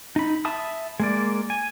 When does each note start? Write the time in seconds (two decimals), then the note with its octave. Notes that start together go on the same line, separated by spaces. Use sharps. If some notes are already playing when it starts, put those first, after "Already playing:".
0.16 D#4 B5
0.45 E5 A5 B5 D#6
1.00 G#3 A#3 D5
1.50 G#5